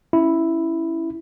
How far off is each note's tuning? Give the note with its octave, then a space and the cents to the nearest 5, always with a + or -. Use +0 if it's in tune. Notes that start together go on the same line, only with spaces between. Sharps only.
C#4 +0 E4 +0